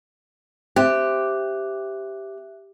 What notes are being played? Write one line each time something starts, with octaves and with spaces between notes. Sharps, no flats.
C4 G4 E5 F#6